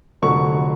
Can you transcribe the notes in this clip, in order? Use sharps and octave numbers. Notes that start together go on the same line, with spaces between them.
F1 F2 D3 F#3 C#6